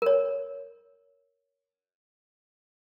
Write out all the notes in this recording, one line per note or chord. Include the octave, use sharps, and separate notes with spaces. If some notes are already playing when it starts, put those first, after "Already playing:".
A#4 C#5